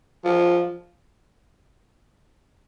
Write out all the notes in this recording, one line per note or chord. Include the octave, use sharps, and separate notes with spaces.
F3